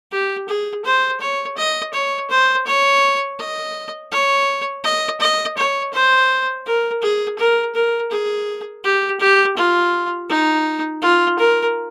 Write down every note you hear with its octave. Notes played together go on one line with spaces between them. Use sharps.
G4
G#4
C5
C#5
D#5
C#5
C5
C#5
D#5
C#5
D#5
D#5
C#5
C5
A#4
G#4
A#4
A#4
G#4
G4
G4
F4
D#4
F4
A#4